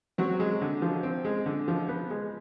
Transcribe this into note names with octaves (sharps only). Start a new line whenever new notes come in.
F#3 C4 F#4
G#3
D3
F3
C4
G#3
D3
F3
B3
G#3